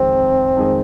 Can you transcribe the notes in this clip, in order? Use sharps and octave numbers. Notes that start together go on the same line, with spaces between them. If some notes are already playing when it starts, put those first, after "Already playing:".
Already playing: F2 D#3 G#3 C4 D#4
F2 D#3 G#3 D#4